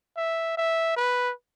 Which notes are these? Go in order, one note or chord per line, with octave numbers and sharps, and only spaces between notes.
E5
E5
B4